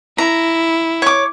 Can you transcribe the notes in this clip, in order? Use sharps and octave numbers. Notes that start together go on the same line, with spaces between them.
E4 A#5
C#5 D6